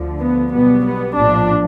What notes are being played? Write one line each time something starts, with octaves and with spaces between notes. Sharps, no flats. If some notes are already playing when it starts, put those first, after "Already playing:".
Already playing: D2 D3 F3
B3
B1 B2 G3 B3
B3
A#1 A2 F3 D4